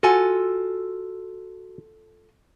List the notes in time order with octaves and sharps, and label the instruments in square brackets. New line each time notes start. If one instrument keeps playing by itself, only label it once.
[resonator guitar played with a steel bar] F4 A4 G#5 [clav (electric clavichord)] F#4